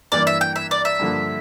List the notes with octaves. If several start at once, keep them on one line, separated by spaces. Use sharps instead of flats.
G2 E3 A#3 E4 A#4 D5
E5
G5
E5
D5
E5
G2 D3 F3 A#3 D4